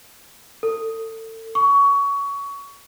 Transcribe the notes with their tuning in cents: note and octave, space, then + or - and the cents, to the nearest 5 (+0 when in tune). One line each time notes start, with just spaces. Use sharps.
A4 +30
C#6 +20